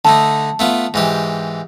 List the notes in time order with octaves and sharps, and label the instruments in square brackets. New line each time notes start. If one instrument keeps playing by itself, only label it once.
[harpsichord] D3 A3 D#4 [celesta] A5
[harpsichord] A3 B3 F4
G#2 E3 G4